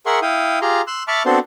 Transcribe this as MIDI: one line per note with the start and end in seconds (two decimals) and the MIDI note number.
0.06 0.19 68
0.06 0.19 70
0.06 0.19 76
0.06 0.19 78
0.06 0.19 84
0.06 0.19 85
0.22 0.59 64
0.22 0.59 77
0.22 0.59 79
0.22 0.59 87
0.62 0.81 65
0.62 0.81 67
0.62 0.81 68
0.62 0.81 82
0.62 0.81 84
0.87 1.03 84
0.87 1.03 88
0.87 1.03 90
1.08 1.23 76
1.08 1.23 81
1.08 1.23 83
1.08 1.23 85
1.08 1.23 86
1.08 1.23 89
1.26 1.39 59
1.26 1.39 60
1.26 1.39 62
1.26 1.39 66
1.26 1.39 69
1.26 1.39 72